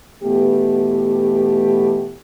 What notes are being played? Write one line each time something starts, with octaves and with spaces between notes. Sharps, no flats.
B2 E3 A3 B3 G4